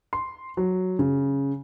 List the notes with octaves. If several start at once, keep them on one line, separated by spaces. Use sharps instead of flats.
C6
F#3
C#3